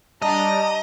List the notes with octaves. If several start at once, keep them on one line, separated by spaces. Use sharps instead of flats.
G3 D4 D5 D#5 A5 A#5